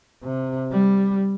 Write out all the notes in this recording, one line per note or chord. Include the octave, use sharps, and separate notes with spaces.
C3
G3